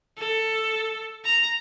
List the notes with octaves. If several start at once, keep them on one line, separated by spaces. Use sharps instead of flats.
A4
A#5